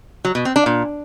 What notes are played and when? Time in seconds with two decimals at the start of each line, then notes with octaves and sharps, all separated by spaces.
0.25 F#3
0.35 B2
0.45 C4
0.56 D4
0.66 A#2